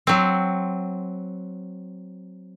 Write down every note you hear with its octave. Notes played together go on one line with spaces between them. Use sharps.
F#3 C4